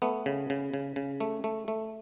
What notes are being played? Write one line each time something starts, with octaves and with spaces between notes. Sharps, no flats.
A3 B3
C#3
C#3
C#3
C#3
A3
A3
A3